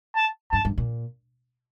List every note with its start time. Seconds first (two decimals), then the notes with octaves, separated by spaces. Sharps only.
0.16 A5
0.52 G2 A5
0.65 G2
0.78 A#2